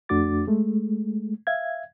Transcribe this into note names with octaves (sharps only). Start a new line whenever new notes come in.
F2 A3 D4 F#4 D6 A6
G#3 A3
E5 F5 G#6